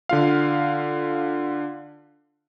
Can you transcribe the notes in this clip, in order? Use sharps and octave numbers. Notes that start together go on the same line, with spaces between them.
D3 F4 F5